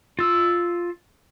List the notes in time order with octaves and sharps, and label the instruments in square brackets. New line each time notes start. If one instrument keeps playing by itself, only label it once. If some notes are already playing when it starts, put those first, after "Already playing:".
[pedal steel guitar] F4 E6